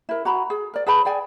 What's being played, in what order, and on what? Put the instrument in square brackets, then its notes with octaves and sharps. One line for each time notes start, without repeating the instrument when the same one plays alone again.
[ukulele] E4 A#4
F#4 A#5 B5
G#4
A#4 D5
G#4 B4 A5 B5
G#4 D5 G5 G#5